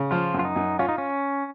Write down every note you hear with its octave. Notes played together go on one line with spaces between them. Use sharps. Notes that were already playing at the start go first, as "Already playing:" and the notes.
Already playing: C#3
F3 F4
F#2
F4
D#4
F#2
C#4 F4
D#4
C#4